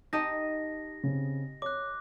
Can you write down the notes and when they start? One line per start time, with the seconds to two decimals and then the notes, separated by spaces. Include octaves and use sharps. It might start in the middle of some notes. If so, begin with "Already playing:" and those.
0.13 D#4 G4 D#5 A5 A#6
1.03 C#3 C4
1.62 C#5 D6 F#6